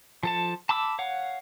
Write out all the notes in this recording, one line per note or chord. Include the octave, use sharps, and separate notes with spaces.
F3 A4 A5
A5 B5 D6 E6
C#5 F5 F#5